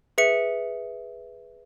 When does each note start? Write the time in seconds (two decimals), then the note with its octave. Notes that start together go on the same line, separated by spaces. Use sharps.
0.18 G#4 B4 E5 C#7